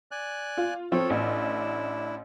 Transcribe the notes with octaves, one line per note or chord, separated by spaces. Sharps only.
D5 G#5 F#6
F4
F3 C4 A4 C#5
A1 D4 E4